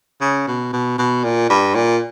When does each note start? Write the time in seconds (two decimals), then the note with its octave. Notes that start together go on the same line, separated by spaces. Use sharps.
0.21 C#3
0.47 B2
0.73 B2
0.98 B2
1.24 A#2
1.49 G2
1.75 A#2